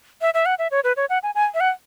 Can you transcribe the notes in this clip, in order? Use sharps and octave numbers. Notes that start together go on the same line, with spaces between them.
E5
E5
F#5
E5
C#5
B4
C#5
F#5
G#5
G#5
E5
F#5